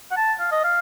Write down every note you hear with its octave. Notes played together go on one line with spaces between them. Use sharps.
F#5
A5
F5
D#5
F5